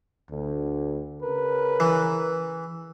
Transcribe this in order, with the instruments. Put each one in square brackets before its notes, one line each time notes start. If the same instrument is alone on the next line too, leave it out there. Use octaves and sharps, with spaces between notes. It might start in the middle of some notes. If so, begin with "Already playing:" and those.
[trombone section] D2
C#3 A#4 B4
[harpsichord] E3